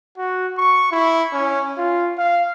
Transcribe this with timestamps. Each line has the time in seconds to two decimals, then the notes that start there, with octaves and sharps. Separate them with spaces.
0.18 F#4
0.58 C#6
0.92 E4
1.33 C#4
1.78 F4
2.18 F5